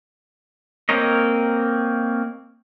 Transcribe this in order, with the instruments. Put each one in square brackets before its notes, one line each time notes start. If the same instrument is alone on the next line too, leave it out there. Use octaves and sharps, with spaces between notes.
[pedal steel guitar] A#3 C4 A#4 C#5 D#5